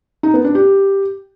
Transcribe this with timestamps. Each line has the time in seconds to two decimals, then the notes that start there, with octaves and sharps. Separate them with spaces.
0.23 D#4
0.34 B3
0.44 D4
0.55 G4